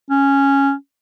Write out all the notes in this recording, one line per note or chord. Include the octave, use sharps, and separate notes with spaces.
C#4